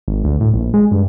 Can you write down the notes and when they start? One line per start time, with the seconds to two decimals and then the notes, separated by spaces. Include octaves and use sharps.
0.08 G#1
0.24 D2
0.40 A2
0.54 A#1
0.74 G#3
0.91 G2